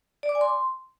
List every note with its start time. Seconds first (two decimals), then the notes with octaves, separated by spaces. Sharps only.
0.23 D5
0.29 D6
0.35 G#5
0.41 C6